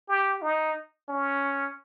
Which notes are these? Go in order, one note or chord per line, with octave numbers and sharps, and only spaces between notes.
G4
D#4
C#4